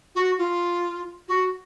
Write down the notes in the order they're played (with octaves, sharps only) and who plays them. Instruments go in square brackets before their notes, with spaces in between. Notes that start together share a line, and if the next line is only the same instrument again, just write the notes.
[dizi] F#4
F4
F#4